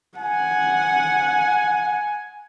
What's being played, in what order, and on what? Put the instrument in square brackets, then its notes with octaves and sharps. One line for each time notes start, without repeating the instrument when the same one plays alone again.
[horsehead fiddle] F#5 [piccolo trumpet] G#5